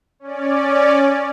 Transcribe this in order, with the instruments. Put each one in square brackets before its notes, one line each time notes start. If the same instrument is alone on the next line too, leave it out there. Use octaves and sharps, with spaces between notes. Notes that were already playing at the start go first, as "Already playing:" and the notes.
[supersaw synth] C#4 D5